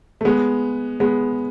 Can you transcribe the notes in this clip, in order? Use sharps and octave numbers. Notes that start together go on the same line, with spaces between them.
A3
G#3 B3
G#3 B3